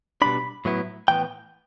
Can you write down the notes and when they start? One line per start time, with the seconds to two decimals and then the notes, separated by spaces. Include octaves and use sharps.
0.22 B2 G3 D4 B5
0.65 A2 F#3 B3 E4
1.08 A2 E3 B3 G5